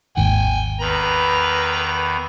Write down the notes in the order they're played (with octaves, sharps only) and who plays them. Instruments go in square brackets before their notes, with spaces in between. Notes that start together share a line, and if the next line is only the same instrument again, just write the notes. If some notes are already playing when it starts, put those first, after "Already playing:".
[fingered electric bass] G#1 D#2 G#2 [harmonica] G5 G#5
[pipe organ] E2 D#3 B5 [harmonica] B4 A#5